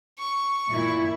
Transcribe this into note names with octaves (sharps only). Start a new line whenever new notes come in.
C#6
A#2 E4